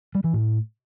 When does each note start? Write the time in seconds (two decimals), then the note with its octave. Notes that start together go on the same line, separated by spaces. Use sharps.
0.15 G3
0.24 E3
0.33 A2